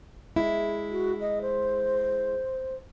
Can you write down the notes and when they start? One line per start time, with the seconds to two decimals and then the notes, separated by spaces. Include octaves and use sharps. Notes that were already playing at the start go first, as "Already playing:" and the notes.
0.36 G#3 E4
0.91 F#4
1.20 D#5
1.41 C5